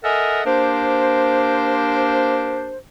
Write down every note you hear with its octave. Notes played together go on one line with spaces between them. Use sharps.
A4 A#4 D#5 E5 F#5 G#5
A#3 D4 G4 A#4 C5